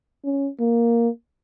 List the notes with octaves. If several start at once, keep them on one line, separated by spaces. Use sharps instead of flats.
C#4
A#3